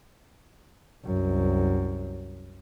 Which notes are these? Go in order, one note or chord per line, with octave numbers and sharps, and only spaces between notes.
C2 F#2